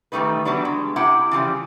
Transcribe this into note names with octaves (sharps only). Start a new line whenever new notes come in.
D#3 E3 G3 A3 D#4 B4
E3 F#3 G3 B3 D4
G#3
C3 E4 G4 F#5
C#3 E3 F3 G3